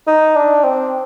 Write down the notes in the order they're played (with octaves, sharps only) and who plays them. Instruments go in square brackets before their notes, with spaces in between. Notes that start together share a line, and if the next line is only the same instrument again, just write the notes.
[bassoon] D#4
D4
C4